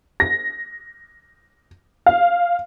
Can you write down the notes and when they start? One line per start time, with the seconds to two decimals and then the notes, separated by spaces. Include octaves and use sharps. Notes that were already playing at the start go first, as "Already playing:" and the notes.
0.20 A#6
2.06 F5